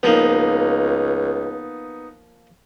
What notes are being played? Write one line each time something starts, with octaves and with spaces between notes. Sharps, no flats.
C#2 F3 A#3 B3 D#4